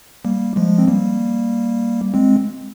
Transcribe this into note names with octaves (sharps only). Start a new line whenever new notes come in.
G3 A#3
F3 G#3
C4
G3 A#3
G#3 C4